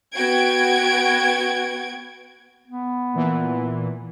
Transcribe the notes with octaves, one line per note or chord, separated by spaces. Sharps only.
B3 F#4 G5 G#6 D7
B3
A#2 E3